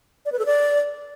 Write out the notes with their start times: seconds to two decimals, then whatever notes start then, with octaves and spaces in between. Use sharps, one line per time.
0.26 D5
0.32 B4
0.39 A4
0.46 D5